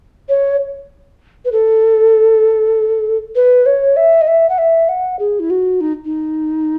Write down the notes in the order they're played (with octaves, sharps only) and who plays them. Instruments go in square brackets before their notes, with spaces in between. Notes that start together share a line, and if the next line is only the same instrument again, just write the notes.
[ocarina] C#5
B4
A4
B4
C#5
E5
D#5
E5
F#5
E5
F#5
G#4
E4
F#4
D#4
D#4